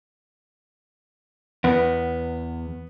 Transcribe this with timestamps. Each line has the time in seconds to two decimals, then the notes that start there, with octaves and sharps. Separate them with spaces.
1.64 E2 B3